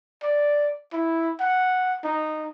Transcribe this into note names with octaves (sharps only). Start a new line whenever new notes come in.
D5
E4
F#5
D#4